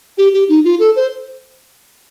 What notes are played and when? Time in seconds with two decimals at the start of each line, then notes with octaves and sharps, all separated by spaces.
0.18 G4
0.33 G4
0.49 D#4
0.64 F4
0.79 A4
0.96 C5